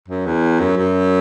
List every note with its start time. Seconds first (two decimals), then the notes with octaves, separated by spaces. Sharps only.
0.09 F#2
0.26 E2
0.60 F#2
0.77 F#2